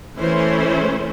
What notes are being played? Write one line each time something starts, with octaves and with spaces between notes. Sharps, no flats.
E3 A3 C#4 C5